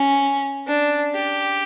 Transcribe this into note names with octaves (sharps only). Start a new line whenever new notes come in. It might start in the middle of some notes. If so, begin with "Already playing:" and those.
Already playing: C#4
D4
G4